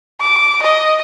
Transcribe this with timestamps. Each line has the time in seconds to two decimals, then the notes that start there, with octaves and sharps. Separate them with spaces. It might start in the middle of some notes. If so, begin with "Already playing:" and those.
0.21 D6
0.63 D#5